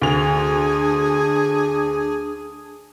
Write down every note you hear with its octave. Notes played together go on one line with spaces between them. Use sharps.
D2 D4 G#4 F7